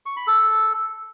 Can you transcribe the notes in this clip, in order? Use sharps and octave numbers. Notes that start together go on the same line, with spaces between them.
C#6
B5
A4